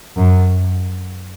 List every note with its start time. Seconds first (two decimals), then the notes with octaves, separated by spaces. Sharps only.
0.17 F#2